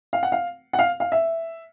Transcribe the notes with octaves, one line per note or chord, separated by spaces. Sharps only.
F5
F#5
F5
F#5
F5
F5
E5